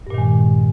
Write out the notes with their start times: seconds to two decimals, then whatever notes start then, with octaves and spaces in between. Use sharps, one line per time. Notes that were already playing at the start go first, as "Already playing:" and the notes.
0.07 G2
0.10 A#2
0.14 D#3
0.18 G#3